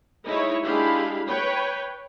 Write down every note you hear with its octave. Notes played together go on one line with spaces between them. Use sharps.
G#3 D#4 E4 C#5
G#3 D4 E4 G4 F5 B5
B4 C#5 G5